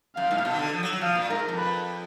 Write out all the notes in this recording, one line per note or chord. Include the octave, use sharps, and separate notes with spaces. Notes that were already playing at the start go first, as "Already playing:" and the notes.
F#2 F5
G#2
A#2
B2
D#3
D3
F3
F#3
F#3
F3 F5
A#2
G#2 A#4
F2
B4